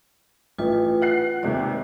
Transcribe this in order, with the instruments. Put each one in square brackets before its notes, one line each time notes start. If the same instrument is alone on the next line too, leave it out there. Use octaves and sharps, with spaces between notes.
[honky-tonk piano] A1 [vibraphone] F4 B4
[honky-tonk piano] F#5 F#6 C7
[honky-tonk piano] D#2 C3 G#3 [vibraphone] D5